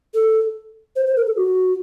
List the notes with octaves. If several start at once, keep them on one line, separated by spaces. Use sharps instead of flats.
A4
C5
C5
A#4
A4
F#4